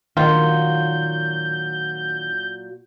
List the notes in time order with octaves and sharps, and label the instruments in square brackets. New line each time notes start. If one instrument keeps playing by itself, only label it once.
[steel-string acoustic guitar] A#2 F#3 F#4 [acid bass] D#3 [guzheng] F4 [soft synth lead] G6